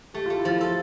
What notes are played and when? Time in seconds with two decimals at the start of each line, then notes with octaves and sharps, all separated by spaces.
0.14 A3 G4
0.26 A3 F4
0.38 E4
0.45 F3 F4
0.61 A4